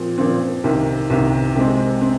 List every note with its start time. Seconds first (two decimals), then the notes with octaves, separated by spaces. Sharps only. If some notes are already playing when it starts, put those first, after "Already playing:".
Already playing: A#2 F3 C4
0.18 A#2 F3 C4
0.64 C2 C3 D#3
1.10 C2 C3 D#3
1.56 C3 G#3 C4
2.01 C4